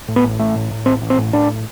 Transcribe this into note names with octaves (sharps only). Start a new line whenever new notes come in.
A2
B3
A1
A1 A3
A2
A2
A1 C4
A1
C4
A2
A2 D4